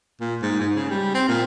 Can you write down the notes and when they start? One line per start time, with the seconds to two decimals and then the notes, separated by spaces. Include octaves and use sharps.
0.20 A#2
0.42 G#2
0.60 G#2
0.75 C#3
0.90 G3
1.15 C4
1.28 A#2